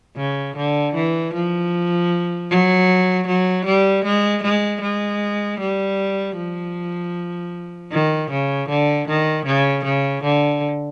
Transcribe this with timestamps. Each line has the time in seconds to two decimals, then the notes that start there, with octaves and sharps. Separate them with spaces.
0.17 C#3
0.56 D3
0.94 E3
1.34 F3
2.50 F#3
3.27 F#3
3.65 G3
4.04 G#3
4.43 G#3
4.81 G#3
5.59 G3
6.37 F3
7.92 D#3
8.30 C#3
8.69 D3
9.08 D#3
9.46 C#3
9.85 C#3
10.23 D3